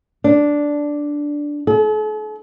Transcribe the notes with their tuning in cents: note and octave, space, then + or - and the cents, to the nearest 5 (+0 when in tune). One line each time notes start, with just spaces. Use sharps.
D4 -5
A4 -45